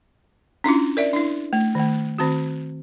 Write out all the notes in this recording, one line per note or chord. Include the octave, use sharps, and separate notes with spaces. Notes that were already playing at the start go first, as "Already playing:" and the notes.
C#4 D4 E4 F4
A#4 D5 E5
D4 E4
A3
D#3 A3
D#3 C4 F#4